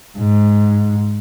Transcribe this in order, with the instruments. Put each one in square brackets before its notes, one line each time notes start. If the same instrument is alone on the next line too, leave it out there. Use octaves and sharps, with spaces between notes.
[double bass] G#2